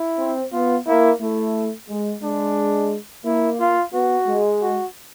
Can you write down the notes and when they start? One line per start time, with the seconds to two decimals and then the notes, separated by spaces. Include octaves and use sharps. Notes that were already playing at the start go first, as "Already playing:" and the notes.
Already playing: E4
0.19 C4
0.53 B3 F4
0.87 A#3 E4
1.21 A3 E4
1.89 G#3
2.23 G#3 D4
3.25 A#3 E4
3.60 F4
3.94 B3 F#4
4.28 G#3
4.62 F#4